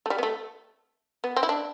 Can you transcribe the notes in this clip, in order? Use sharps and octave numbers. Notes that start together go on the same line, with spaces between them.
A3
G3
B3
A3
B3
C4
E4
D4